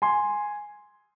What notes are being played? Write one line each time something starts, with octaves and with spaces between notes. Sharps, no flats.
G#5 C6